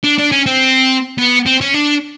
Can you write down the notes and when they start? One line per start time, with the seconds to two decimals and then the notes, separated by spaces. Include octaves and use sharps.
0.04 D4
0.18 D4
0.32 C#4
0.46 C4
1.18 B3
1.46 C4
1.61 C#4
1.74 D4